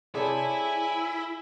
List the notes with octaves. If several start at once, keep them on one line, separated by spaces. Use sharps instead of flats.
C3 E4 G#4 A4 C#5 D5 G#5 B5